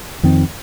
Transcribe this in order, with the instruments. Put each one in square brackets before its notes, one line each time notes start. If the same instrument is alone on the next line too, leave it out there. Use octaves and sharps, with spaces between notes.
[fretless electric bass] F2 D#3 C4